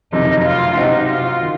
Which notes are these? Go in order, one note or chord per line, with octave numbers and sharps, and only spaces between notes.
F#1 F2 C3 D#3 F#3 D#4
F4
C3 F#3 C4 D#4 F#4
F4
D#3